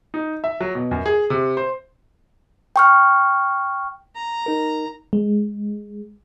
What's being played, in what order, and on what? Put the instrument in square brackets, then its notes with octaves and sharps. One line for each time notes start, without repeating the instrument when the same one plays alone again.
[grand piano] D#4
E5
F#3
B2
F#2
G#4
C3
C5
[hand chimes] G5 C#6 F6
[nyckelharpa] A#5
[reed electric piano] D#4 A#4
[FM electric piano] G#3